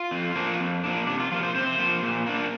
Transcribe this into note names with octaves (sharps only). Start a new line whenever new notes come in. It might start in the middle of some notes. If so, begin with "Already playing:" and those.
Already playing: F4
F2
F3 A#3 D4
F2
F3 A#3 D4
C3 D4
F4
F3 A#3 F4
C5
C3 C5
F3 A#3
A#2
A#3 D4